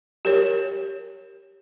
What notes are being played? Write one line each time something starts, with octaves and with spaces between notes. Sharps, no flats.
G4 A#4 C#5